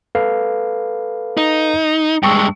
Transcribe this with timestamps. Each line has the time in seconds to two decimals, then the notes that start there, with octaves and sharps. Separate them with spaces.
0.15 A4 B4 F5
1.37 D#4
2.23 G2 G#3 G5 C#6 E6